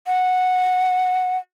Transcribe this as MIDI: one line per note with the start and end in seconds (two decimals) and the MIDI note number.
0.07 1.37 78